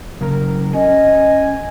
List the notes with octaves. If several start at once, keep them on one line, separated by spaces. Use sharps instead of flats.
C#3 F#3 A#4
C#4 D#5 G#5